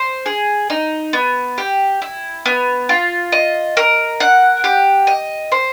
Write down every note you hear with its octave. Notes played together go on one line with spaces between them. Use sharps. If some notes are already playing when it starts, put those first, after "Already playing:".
Already playing: C5
G#4
D#4
B3
G4
E4
B3
F4
D#5
A#4
F#5
G4
D#5
C5